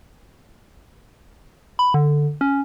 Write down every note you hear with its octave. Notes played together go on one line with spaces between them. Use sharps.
B5
D3
C#4